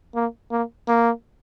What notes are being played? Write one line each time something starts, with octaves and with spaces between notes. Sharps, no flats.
A#3
A#3
A#3